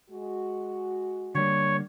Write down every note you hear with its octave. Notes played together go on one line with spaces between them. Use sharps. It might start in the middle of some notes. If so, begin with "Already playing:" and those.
G#3 F#4
D3 G3 A#3 C#5